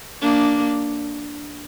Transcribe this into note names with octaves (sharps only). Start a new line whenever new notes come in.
A#3 D4